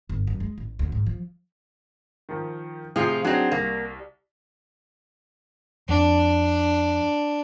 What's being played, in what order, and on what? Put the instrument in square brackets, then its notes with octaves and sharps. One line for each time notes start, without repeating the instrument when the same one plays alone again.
[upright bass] G1
F#2
G#3
A1
D2
G#2
F3
[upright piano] D#3 F3
[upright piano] A2 C3 G#4 [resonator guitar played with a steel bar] F3 F4
[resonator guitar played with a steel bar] F#3 C4 [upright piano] D4 D#4 G#4
[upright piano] C2 [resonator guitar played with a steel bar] A#3
[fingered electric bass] F2 [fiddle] D4